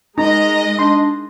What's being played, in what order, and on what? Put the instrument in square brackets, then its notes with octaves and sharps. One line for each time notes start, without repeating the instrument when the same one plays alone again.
[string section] G#3 D#5 [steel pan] D#4 [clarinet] A#5
[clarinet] D4 [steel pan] C6